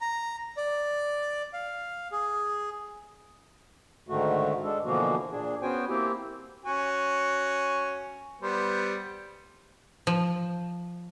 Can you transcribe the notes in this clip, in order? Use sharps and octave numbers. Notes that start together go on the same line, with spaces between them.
A#5
D5
F5
G#4
G#2 D3 D#3 A3 F#4
G#3 D4 A4
B2 D3 E3 F3 A#3 F#4
A#2 D4 G#4
B3 C#4 F#4 C5 G5 G#5
A#3 C4 E4 G4
C#4 F#4 G#5
G3 B3 C5
F3